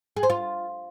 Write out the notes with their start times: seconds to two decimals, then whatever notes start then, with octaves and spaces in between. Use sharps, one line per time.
0.17 G#4
0.23 C5
0.30 F4